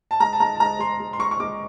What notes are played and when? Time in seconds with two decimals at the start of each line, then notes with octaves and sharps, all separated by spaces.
0.11 A5
0.20 G#3 A#5
0.33 A5
0.40 G#3 A#5
0.55 A5
0.60 G#3 A#5
0.79 G#3 C6
1.00 G#3
1.13 C6
1.19 G#3 C#6
1.31 C#6
1.40 G#3 D6